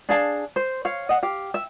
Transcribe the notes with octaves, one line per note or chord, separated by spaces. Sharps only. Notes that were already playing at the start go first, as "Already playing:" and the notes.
D4 G#4 F5 A5
C5
C#5 F5
D#5 F#5
G4 F5
E5